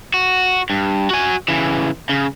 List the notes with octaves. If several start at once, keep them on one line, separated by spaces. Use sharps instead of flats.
F#4
G2
F#4 G#5
C#3 E3
C#3